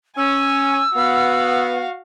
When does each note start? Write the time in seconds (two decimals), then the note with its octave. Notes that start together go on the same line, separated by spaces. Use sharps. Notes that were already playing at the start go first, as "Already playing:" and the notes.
0.17 C#4 G#5 E6
0.96 B3 F#4 F5